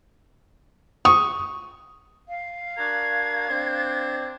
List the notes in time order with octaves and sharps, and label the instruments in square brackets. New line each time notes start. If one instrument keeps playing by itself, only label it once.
[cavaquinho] C#6 [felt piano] D#6
[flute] F5
[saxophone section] D4 F#4 A#4 [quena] G#6
[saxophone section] C4 D4